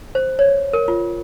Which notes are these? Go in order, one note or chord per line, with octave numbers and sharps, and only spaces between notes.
C5
C#5
A#4
F4